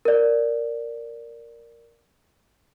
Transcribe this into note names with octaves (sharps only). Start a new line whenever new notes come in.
A#4 D5